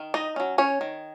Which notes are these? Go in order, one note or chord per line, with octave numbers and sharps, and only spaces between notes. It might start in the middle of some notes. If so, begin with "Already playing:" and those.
Already playing: D#3
D#4 D#5
F#3 C#4
C#4 C#5
D#3